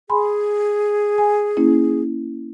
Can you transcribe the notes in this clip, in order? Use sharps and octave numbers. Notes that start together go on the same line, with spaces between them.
G#4 G#5 B5 C6
G#5
A#3 C#4 E4